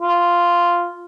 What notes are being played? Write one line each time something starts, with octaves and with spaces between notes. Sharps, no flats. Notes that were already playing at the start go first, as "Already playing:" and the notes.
F4